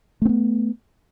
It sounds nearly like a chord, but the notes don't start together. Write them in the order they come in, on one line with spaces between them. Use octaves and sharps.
A3 C4 B3